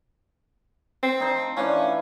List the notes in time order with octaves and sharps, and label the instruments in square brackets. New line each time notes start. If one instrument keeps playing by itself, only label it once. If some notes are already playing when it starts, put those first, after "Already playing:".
[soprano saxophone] C4
[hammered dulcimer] D#4 C5 A5
[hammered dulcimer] E3 D4 F4 [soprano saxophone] C#4